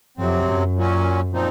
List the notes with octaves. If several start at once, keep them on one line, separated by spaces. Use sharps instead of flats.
F2 C3 F#3 C4
F#2
A#2 F#3 C#4
A#2 F3 C4 D#4